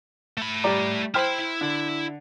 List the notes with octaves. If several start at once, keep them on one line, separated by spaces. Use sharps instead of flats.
A3 B5
G3 D5 A#5
E4 C5 G5 B5 F6
D3